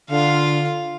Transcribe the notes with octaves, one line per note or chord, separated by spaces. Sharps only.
D3 F4 F5